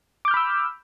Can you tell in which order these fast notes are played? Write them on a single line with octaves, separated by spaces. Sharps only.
D6 G6 F6 B5 E6